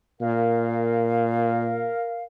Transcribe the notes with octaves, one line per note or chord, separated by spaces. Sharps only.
A#2 A#4 F5